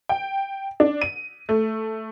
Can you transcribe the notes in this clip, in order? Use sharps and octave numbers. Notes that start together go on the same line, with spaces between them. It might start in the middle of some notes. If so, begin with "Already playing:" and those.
G5
D4
D#7
A3